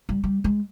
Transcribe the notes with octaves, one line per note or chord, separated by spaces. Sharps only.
G3
G3
G#3